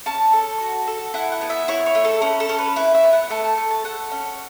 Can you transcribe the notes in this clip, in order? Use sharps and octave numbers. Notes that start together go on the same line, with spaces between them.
C#4 A5
A4
F#4
A4
E4 F#5
F#5
B3
E5
E4 C#5
C#5
A3
A4
C#4 B4
A4
C#4
B4
E4 B4
E5
B3
F#5
A3 A5
A5
A3
A5
A4 F#5
C#4